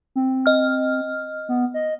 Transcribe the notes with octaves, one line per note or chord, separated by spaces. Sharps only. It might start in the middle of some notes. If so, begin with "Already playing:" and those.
C4
D#5 F6
B3
D#5